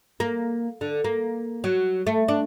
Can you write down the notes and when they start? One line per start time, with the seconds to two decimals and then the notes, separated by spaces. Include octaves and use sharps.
0.20 A#3
0.81 D3
1.04 A#3
1.64 F#3
2.07 A3
2.28 D4